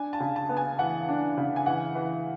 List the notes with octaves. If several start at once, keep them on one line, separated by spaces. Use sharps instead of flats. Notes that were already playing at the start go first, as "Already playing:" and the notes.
Already playing: D4 G#5
A5
C#3
A5
B3
G#5
E3 F#5
D4
C#3
G#5
E3 F#5
E3